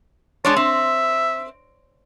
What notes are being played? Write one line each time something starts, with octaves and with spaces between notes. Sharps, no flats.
G#3 D4 C#5 A5
C4 E5